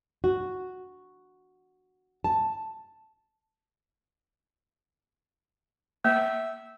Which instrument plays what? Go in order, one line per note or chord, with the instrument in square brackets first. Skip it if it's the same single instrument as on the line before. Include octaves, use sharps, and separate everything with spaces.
[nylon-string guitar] F#4
A5
[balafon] A#3 [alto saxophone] E5